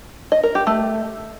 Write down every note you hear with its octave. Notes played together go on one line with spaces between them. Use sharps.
D#5
A#4
G4
A3